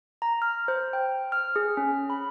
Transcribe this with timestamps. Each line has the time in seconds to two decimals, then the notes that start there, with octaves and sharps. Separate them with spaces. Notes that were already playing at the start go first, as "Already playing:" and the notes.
0.22 A#5
0.42 F6
0.68 C5
0.93 G5
1.32 F6
1.56 G#4
1.77 C#4
2.10 B5